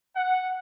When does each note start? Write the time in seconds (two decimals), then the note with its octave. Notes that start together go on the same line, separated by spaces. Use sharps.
0.16 F#5